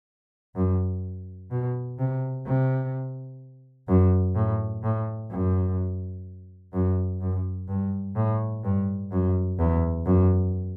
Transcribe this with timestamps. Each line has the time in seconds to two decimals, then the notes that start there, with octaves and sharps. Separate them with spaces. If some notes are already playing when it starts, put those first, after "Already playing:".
0.55 F#2
1.51 B2
1.99 C3
2.46 C3
3.88 F#2
4.35 A2
4.83 A2
5.30 F#2
6.73 F#2
7.21 F#2
7.68 G2
8.15 A2
8.64 G2
9.11 F#2
9.59 E2
10.06 F#2